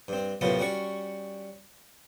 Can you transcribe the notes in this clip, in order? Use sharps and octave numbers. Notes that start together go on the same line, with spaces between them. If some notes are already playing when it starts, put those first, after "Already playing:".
G2 C4
F#2 A2 C3 F#3 B3 F4
G3 C#4 F#4 C#6